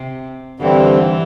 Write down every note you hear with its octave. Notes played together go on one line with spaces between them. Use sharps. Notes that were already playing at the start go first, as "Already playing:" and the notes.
Already playing: C3
G2 D3 E3 G3 C4